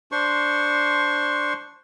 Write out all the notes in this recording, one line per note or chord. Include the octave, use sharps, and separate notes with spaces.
D4 C5 C6 C#6